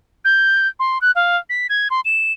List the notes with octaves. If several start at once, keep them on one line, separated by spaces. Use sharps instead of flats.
G6
C6
F#6
F5
B6
G#6
C6
E7